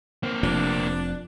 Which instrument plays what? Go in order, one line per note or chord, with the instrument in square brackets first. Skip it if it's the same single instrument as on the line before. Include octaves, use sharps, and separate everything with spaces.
[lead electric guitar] A#3 C4
[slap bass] F1 C3 F3 [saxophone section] D4